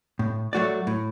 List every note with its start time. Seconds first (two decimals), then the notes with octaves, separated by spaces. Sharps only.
0.19 A2
0.53 F#3 A3 F#4 D5
0.87 A2